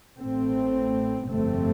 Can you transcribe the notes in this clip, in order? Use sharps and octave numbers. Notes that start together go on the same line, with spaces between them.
A1 A2 A3 C4
G1 F2 C3 A3 C4